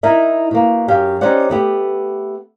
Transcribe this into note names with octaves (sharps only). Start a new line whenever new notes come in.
D#4 E4 A#4 E5
B2 A#3
F#2 G4 F5
C#4 D#4 G4 C5 D5 F#5
A3 B3 G4